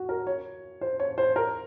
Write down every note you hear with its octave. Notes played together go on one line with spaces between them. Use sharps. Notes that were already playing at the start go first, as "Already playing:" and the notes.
Already playing: F#4
A#4
C#5
C5
C#5
C5
A#4